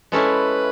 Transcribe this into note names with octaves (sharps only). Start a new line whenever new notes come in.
G#3 C#4 E4 A4 B4